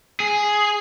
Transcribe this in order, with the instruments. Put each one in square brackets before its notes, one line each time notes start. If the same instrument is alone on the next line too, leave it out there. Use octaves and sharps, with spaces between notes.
[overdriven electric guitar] G#4